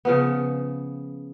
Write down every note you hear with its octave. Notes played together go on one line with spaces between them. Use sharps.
C#3 F3 B3